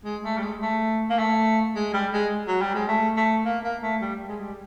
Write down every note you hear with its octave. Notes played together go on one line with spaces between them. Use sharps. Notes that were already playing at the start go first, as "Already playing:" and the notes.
G#3
A3
G3
G#3
A3
A#3
A3
G#3
G3
G#3
F#3
G3
G#3
A3
A3
A#3
A#3
A3
G3
G#3
G3